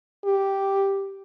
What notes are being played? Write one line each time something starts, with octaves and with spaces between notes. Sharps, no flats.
G4